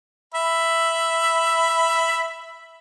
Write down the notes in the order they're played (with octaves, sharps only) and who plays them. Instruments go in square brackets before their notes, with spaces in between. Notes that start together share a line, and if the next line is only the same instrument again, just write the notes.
[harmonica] E5 B5